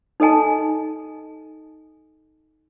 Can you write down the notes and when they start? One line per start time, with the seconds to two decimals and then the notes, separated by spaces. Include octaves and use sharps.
0.20 D#4 A4 D#5 G#5 A5